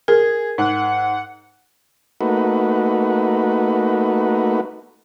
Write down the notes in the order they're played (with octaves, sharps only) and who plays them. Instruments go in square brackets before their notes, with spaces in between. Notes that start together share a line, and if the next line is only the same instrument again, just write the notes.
[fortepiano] G#4 [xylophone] A#4
[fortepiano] G#2 [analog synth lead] F#5
[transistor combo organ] A3 A#3 D#4 F#4 B4